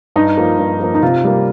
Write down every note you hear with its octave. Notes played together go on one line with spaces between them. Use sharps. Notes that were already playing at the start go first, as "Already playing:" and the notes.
G2 D#4
F3 A#3
G2
F3 A#3
D#4
C3 F4
G3 A#3